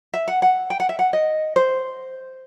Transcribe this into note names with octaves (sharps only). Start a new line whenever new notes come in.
E5
F#5
F#5
G5
F#5
E5
F#5
D#5
C5